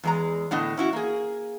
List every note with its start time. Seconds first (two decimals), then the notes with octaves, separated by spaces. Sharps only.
0.04 E2 G#3 A#5
0.51 A2 D3 B3 D#5
0.77 C#4 E4 F#4
0.93 A#3 G#4